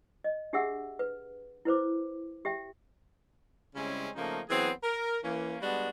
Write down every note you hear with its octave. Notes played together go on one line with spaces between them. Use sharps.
D#5
D4 G4 G#4 E5 F#5 E6
B4
E4 B4 C5 D6
G4 E5 G5
C#3 G3 G#3 C4 C#4 E4
C#3 F3 A3 A#3 D#4 C5
E3 F#3 B3 C4 G#4
A#4
E3 A#3 C#4
G3 G#3 B3 D4 F#4 A4